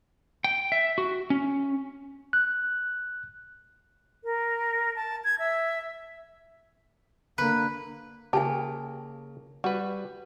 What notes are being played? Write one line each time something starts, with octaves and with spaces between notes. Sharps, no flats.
G5
E5
F#4
C#4
F#6
A#4
A5
G#6
E5
D3 A#3 B4
C#3 A#3 G4 G#5 A5
G3 F#4 B4